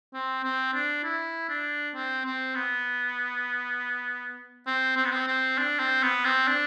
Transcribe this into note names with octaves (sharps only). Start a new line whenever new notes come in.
C4
C4
D4
E4
D4
C4
C4
B3
C4
C4
B3
C4
C4
D4
C4
B3
C4
D4